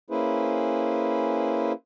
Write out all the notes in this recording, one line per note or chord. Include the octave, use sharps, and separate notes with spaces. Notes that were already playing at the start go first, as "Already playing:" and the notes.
A#3 C#4 E4 G#4 B4 C5